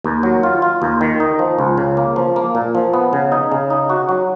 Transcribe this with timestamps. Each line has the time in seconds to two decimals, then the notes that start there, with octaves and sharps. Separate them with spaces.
0.04 D#2
0.23 F#3
0.43 F4
0.62 F4
0.82 D#2
1.01 D#3
1.20 D#4
1.39 F3
1.58 C#2
1.78 C#3
1.97 A#3
2.16 F3
2.36 A#3
2.55 A#2
2.75 F3
2.93 B3
3.13 C#3
3.32 D#4
3.52 C#3
3.70 D#4
3.90 F#4
4.09 F#3